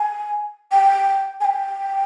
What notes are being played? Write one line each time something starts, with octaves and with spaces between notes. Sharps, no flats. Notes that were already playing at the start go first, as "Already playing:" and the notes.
Already playing: G#5
G5
G#5
G5